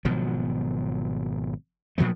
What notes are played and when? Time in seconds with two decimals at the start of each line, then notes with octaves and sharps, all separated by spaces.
0.05 G#1 B2 F3 F#3
1.98 A#2 F3 F#3 A3